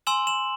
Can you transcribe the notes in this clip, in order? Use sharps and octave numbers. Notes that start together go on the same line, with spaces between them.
G#5 C6 E6 E7 F#7
E7 F#7